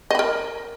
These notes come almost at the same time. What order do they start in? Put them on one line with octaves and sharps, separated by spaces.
D#5 B5 A#4